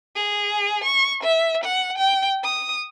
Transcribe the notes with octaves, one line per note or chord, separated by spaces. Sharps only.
G#4
C#6
E5
F#5
G5
D#6